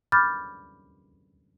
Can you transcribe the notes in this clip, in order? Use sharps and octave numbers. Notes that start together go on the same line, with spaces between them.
B5 D6 F6 G6 A6